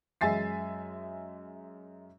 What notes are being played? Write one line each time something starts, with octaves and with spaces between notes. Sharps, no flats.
F#2 G#3 E5 G#5 A6 C7